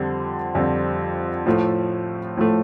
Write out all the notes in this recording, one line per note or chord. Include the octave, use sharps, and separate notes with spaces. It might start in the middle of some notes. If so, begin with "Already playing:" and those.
Already playing: F2 D3 G3 C4
F2 D3 G3 C4
A2 F3 A3
A2 F3 A3